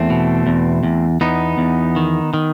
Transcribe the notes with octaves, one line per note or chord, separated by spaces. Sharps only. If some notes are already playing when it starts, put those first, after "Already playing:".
Already playing: E2 A3 C4
B2
E2
E2
E2 B3 D#4
E2
D#3
D#3